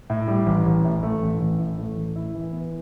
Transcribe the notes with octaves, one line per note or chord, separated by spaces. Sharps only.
A2
G3
A1
A1
A2
A3
A1
A1
A2
A3
A1
E4
E3
B3